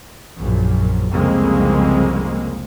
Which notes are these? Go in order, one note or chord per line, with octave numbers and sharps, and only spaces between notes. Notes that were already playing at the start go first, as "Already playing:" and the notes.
A#1 F#2 A#2
C2 F2 C#3 G#3 A#3 C4